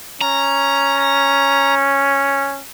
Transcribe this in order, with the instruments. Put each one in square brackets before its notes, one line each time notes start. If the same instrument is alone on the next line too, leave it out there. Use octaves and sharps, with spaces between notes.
[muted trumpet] C#4 [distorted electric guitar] A#5